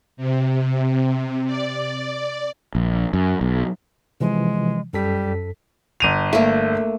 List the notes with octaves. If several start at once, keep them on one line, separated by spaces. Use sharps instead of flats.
C3
D5
A#1
F#2
B1
C3 E3 F3 G#3
F#2 G3 A4 B6
G1 D#7 F7
A3 A#3 E5